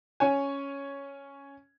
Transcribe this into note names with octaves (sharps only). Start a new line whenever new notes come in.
C#4 C#5 G#5